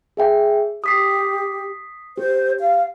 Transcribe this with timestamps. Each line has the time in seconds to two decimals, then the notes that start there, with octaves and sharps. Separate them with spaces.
0.17 G#4 E5 G5
0.84 G4 D#6 B6 C7
2.18 G4 C5
2.60 F5